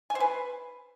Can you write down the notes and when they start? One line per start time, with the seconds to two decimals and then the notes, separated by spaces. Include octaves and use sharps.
0.10 G#5
0.15 C5
0.20 B4